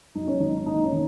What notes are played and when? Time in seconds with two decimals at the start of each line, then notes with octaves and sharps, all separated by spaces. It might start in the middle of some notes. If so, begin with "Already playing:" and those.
0.15 F#2 D#4
0.27 C#4
0.40 G#1 D#4
0.66 A#3 D#4
0.84 C#4
0.93 D#3